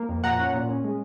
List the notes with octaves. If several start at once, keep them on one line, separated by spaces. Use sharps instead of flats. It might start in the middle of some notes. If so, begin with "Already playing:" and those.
Already playing: A#3
F2
A#2 F#5 A#5
C#4
A#2
C#4
G#3